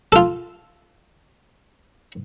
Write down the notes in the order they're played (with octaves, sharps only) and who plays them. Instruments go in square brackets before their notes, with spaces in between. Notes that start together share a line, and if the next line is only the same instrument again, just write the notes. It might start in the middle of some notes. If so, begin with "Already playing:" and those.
[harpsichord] F4 A4